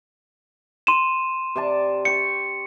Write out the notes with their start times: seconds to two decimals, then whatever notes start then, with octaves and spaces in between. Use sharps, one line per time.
0.87 C6 D#7 E7
1.55 C3 D5 A5
2.05 G5 C#6 C#7